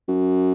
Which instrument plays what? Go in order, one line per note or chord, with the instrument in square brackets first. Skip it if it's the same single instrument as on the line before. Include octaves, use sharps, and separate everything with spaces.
[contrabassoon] F#2